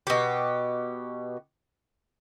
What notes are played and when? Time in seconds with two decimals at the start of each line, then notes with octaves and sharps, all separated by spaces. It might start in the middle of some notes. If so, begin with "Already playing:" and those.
0.07 B2 G4